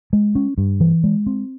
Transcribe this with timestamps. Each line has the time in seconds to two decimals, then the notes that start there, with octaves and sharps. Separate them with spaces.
0.13 G#3
0.35 C#4
0.58 G2
0.80 E3
1.04 G#3
1.26 C4